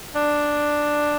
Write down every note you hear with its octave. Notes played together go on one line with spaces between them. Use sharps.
D4